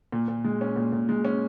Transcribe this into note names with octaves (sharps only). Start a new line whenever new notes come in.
A#2
A#2
G#3
C#4
A#2
A#2
G#3
C#4